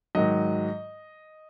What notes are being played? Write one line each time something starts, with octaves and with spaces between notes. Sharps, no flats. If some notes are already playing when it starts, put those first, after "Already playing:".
G#2 D#3 F#3 D#5